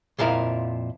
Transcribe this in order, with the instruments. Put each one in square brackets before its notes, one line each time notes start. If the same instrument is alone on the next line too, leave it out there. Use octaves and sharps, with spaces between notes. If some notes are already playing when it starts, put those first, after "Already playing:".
[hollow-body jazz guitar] F2 A#2 F3 E4 A#4